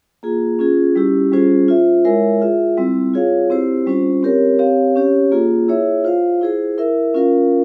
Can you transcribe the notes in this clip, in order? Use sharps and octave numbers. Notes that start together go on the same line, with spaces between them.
A#3 F4 G#4
C#4 F4 G#4
G3 C#4 E4 G4
G3 C#4 F4 G#4 C5
F4 C5 E5
G#3 E4 A#4 C#5 E5
F4 G#4 E5
G3 C4 E4
F4 G#4 C#5 F5
C4 E4 G4 C5
G3 C#4 F4 C5
C4 G4 A#4 C#5
C4 G4 C#5 F5
C#4 G4 C#5
A#3 F4 G#4
E4 G#4 C#5 E5
F4 C5 F5
E4 G#4 C5
E4 A#4 E5
C#4 F4 A#4 F5